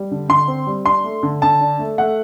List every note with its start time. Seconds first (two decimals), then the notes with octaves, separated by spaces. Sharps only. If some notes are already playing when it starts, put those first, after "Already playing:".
Already playing: G3
0.11 D3
0.29 D3 C6
0.48 C4
0.67 G3
0.86 D4 C6
1.04 A3
1.23 D3
1.42 D3 A5
1.61 D4
1.79 A3
1.98 A3 F#5